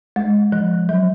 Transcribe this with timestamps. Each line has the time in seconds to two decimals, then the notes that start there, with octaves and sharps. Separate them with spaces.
0.16 G#3
0.52 F3
0.89 F#3